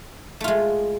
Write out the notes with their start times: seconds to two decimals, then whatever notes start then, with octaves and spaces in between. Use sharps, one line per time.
0.41 A3
0.44 F4
0.48 G#3